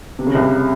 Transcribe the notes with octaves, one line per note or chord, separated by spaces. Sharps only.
C3
C#3
C2 C3